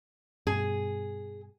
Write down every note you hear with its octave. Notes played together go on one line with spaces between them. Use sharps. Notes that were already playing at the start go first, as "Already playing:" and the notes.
G2 B2 G#4